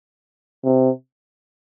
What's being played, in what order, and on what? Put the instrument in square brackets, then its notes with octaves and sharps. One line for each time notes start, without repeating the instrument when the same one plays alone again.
[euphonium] C3